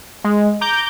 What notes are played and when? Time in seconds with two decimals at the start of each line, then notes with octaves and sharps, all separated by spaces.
0.24 G#3
0.61 A#5 D6 G6